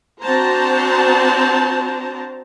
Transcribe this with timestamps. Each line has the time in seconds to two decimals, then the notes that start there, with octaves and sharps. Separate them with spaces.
0.22 C4 D4 F#4 C5 A5 A#5